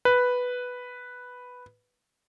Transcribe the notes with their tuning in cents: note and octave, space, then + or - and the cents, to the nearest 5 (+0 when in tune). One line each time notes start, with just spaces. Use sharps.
B4 +0